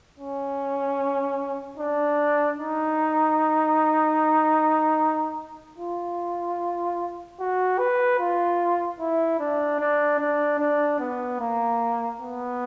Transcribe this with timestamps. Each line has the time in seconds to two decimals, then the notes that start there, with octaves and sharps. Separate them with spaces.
0.18 C#4
1.78 D4
2.58 D#4
5.78 F4
7.40 F#4
7.79 B4
8.19 F4
8.99 E4
9.40 D4
9.80 D4
10.20 D4
10.60 D4
11.00 B3
11.40 A#3
12.21 B3